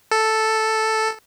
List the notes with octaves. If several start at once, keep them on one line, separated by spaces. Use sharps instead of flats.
A4